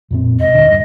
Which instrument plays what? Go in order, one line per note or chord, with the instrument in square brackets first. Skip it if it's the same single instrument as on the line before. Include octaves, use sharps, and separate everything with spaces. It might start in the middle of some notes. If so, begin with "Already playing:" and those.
[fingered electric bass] F2 A#2 C4
[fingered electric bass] E1 [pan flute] D#5
[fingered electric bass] D#1 D3
G2